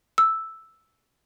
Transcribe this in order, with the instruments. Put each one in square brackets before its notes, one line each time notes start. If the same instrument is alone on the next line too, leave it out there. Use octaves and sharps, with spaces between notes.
[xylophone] E6